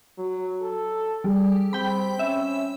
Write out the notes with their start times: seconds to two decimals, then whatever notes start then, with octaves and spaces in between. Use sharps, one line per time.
0.18 F#3
0.62 A4
1.24 G3 G#4
1.73 C4 G5 B5
2.19 C#4 E5